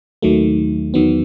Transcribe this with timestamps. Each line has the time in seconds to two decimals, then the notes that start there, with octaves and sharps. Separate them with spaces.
0.22 D#2 D#3 F#3 A3
0.94 E2 D#3 F#3 B3